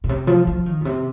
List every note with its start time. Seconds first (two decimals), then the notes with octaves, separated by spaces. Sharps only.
0.04 A#2
0.09 C3
0.27 F3
0.47 F3
0.66 D#3
0.81 A#2
0.85 C3